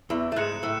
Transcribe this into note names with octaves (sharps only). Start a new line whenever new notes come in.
E2 E3
A3
G#2 G#3 F#6 C#7 E7
A2 A3